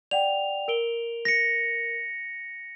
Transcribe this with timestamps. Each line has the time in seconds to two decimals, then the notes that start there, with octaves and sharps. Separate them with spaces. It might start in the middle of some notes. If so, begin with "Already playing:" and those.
0.11 D5 F#5 G5 F7
0.68 A#4 D7 G7
1.25 A#6 C#7